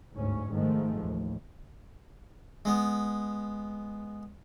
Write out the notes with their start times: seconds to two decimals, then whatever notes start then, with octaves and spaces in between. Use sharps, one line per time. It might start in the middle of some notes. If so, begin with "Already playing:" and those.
0.13 G1 D2 G#2 C#4
0.51 G#2 D#3 F3 G#3 A3
1.01 A1 D#2
2.65 G#3 B3